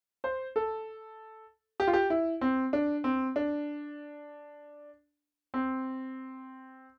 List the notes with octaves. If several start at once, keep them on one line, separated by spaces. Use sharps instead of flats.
C5
A4
G4
F4
G4
E4
C4
D4
C4
D4
C4